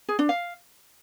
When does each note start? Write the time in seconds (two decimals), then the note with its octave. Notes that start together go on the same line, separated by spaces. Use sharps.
0.09 G#4
0.19 D4
0.29 F5